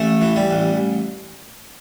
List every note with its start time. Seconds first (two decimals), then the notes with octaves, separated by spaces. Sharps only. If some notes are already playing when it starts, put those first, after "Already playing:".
Already playing: A1 A3
0.21 E3
0.36 G3
0.51 A1